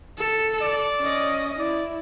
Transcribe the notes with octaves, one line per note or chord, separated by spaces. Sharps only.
A4
D5
C#4 D#5
E4 D5